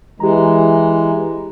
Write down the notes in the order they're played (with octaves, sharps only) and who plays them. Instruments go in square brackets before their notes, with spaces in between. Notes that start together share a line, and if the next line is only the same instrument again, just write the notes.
[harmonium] E3 G#3 [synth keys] G4 A#5